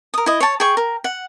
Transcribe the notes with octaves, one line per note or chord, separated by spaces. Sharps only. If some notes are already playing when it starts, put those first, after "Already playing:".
A#4 D#6
E4 D#5
C#5 A5
G#4 G5 C#6
A#4
F#5